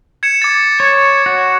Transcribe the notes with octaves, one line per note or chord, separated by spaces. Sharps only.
G#6 C#7 E7
D6 A6
C#5
F#4